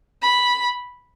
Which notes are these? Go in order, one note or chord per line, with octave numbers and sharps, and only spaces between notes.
B5